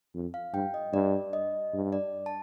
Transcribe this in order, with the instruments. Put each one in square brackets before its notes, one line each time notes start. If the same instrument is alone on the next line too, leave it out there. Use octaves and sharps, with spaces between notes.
[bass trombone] F2
[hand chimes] F5
[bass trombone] G2 [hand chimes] G5
[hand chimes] D#5
[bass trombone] G2 [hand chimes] D5
[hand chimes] D#5
[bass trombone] G2
[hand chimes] D5
A5